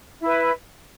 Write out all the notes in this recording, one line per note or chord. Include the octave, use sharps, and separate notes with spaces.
E4 B4 E5